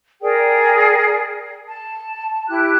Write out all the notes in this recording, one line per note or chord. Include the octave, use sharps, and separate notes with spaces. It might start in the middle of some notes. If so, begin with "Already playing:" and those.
G#4 A#4 D5 G5
A5
E4 G4 F#6